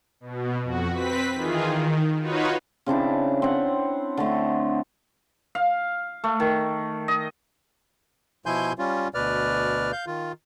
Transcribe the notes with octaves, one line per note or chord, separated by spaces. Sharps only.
B2
F2 F#4
C4 B4 B6
D#3 E3 F4 G#4
D#3
D#4 F4 F#4 B4 C#5
C#3 C4 D4 E4
C4 F#5
D3 A3
F5
A3
D#3
D#5
B2 F3 E4 G#5 C6 G6
G3 C#4 F4
D2 B2 B4 D5 F6
F5 G6
D#3 F4